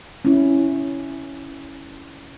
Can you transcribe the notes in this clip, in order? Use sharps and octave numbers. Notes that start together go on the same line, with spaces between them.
C#4 E4